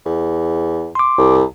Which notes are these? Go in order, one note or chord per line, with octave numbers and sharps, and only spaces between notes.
E2
C6 D6
C2